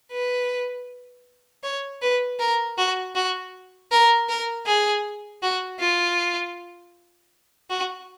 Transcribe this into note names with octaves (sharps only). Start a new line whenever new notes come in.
B4
C#5
B4
A#4
F#4
F#4
A#4
A#4
G#4
F#4
F4
F#4